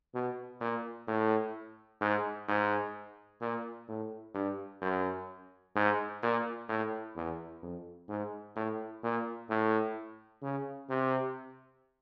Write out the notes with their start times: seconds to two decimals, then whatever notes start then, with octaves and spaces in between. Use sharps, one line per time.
0.15 B2
0.61 A#2
1.07 A2
2.01 G#2
2.49 G#2
3.41 A#2
3.88 A2
4.35 G2
4.82 F#2
5.76 G#2
6.23 A#2
6.69 A2
7.16 E2
7.62 F2
8.09 G#2
8.56 A2
9.03 A#2
9.50 A2
10.43 C#3
10.89 C3